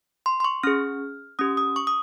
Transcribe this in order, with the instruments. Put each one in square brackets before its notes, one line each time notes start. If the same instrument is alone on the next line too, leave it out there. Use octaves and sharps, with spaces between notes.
[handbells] C6
C6
C#6
C#4 G#4 F6
C#4 G4 D#6
D#6
C#6
D#6